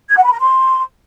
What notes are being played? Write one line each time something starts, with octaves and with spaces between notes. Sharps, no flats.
G#6
F#5
B5
A#5
C6